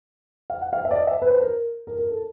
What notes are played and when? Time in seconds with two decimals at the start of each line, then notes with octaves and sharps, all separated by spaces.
0.50 F5
0.61 F#5
0.73 F5
0.85 E5
0.91 D5
0.96 D#5
1.07 E5
1.22 B4
1.31 C5
1.42 A#4
1.87 A#4
1.98 A#4
2.11 A4